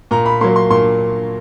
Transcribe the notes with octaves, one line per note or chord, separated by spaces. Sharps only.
A#2 A#5
B5
F#3 A#3 C6
C6
A#2 C6